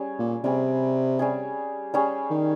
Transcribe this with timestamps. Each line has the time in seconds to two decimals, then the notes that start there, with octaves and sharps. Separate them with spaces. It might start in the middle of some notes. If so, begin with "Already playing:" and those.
Already playing: G3 C#4 G#4
0.19 A#2
0.44 C3 G3 C#4 G#4
1.19 G3 C#4 G#4
1.94 G3 C#4 G#4
2.31 D#3